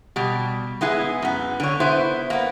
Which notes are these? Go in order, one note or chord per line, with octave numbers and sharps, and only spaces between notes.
B2 G3
G#3 B3 E4 G#4
F#2 B3
D3 C#5
B3 E4 C5
A#3 B3